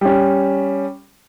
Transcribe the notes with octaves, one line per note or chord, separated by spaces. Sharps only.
G3 C#4